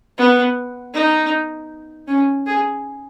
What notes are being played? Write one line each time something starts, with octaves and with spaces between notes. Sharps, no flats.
B3
D#4
C#4
G#4